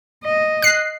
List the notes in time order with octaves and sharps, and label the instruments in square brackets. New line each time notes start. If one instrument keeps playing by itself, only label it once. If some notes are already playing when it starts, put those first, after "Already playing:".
[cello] D#5
[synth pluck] F#6 C7